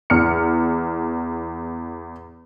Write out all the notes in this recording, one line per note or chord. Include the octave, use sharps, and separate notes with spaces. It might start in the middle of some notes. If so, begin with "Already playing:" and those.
E2 F6 C#7